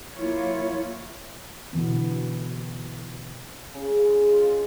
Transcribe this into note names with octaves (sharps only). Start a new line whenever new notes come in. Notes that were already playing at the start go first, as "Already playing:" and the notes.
F#3 A#3 E4 F4 C#5
B2 D3 E3 B3
C#3
G#3
F4